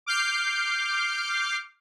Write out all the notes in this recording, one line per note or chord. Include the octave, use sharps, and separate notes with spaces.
D6 F6 G6 C7